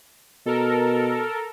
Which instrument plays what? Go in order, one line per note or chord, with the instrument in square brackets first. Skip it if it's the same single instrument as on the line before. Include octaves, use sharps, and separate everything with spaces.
[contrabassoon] B2 [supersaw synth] A4 A#4